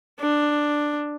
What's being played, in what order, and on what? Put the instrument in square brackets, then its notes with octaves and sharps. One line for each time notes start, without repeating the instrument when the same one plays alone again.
[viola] D4